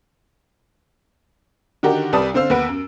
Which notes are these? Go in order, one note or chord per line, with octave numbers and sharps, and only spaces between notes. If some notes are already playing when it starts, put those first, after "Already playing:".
D3 D#3 F#4 G4 A#4
C2 G3 B4 D5 A5 D#6
D3 C4 C5 F5 E6
D#2 B3 B4 F#5 D7
F#2